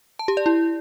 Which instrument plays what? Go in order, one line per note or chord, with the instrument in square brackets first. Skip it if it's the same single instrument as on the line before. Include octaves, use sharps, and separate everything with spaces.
[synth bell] A5
G4
D5
E4